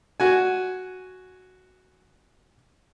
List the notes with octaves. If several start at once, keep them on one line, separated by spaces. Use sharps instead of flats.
F#4 G#5